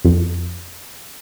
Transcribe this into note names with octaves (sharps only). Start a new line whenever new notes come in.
F2